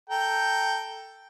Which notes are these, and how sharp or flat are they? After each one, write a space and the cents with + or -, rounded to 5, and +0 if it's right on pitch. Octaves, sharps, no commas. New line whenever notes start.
A4 +5 G5 +0 A#5 +0